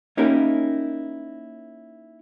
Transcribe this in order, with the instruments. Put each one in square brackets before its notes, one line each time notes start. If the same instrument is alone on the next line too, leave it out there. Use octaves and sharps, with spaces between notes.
[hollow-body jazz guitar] A#3 C#4 D#4 E4 G4 A#4